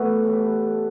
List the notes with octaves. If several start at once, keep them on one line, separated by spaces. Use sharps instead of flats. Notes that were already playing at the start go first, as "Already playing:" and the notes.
Already playing: B2 E3 F#3 A3 B3 F#4
A2 E3 G3